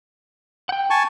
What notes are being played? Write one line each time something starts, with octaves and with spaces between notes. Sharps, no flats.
F#5 G5
G#5 A5 C#6